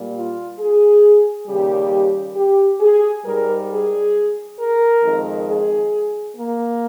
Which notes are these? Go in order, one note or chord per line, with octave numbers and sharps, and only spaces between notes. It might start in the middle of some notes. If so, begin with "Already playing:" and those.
Already playing: A#2 G3
F4
G#4
D#2 C#3 G3 G4
G4
G#4
G#2 G3 A#4
G#4
A#4
F2 D#3 G#3
G#4
A#3